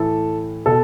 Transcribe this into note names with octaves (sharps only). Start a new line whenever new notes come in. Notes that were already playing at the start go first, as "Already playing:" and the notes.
Already playing: A2 E3 A4
B2 A4